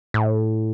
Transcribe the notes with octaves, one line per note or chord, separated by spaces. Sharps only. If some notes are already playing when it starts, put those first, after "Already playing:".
A2